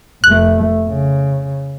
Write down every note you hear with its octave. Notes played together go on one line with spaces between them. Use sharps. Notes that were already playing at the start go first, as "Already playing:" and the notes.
F1 A3 F#6
C#3